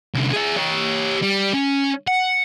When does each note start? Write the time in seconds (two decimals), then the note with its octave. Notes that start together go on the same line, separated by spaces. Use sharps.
0.14 C2 D3
0.33 G#4 E5
0.56 G4 C#5
1.22 G3
1.53 C#4
2.07 F#5